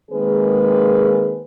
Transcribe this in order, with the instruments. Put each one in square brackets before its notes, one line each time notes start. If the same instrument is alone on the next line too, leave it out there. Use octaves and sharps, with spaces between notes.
[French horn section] D#3 G#3 A#3 C4 G#4 B4